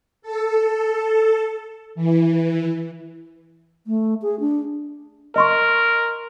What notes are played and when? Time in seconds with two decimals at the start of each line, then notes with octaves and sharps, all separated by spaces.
0.22 A4
1.95 E3
3.87 A3
4.22 G#4
4.40 D4
5.36 A#4 D#5 C6 C#6